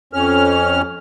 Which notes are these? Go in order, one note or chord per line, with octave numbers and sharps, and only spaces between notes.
F2 C#4 F6